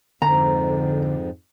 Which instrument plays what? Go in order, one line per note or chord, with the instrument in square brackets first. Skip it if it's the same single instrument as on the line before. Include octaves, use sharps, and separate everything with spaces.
[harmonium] F2 G#2 [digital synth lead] D3 [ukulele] A#5